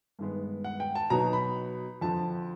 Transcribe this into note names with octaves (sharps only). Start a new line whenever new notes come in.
G2 D#3 G#3 B3
F#5
G5
A5
B2 F#3 B3 D#4 A#5
B5
F2 D3 F3 A5